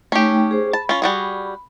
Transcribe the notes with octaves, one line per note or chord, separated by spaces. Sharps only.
A3 C#4 D#4 G4 G5
G#4 C5
A5 B5
C#4 F4
G3 F#4 G#4